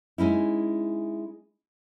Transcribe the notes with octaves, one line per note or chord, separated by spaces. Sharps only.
G#3 C#4 D#4 E4